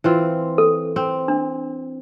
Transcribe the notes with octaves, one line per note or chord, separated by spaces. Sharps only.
E3 C4 F4
A4
C4
D4